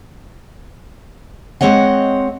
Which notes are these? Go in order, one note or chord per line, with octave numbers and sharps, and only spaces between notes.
G#3 C4 C#5 D#5 F#5